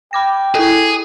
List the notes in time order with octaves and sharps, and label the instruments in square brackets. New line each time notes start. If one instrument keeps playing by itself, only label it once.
[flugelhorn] G5 [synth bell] B5 D6 A#6
[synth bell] E4 A4 [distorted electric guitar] G#4